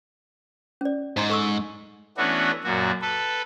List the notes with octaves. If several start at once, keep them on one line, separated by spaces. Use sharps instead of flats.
C#4 D5
G#2 D#5 A#5 C6
A4 C#6 E6
E3 A3 B3 C#4 D4 F#4
F#2 A#2 F#4
A4 B4